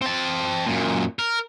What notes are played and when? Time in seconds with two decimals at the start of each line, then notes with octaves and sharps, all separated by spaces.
0.02 C4 A5
0.66 F#2 A#2
1.19 A#4